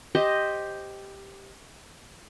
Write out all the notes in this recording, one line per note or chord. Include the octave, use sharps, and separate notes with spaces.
G4 C5 D#5